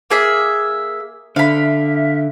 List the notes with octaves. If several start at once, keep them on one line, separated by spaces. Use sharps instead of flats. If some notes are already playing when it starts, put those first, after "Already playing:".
A#3 G#4 E5
D3 E5 F5 B5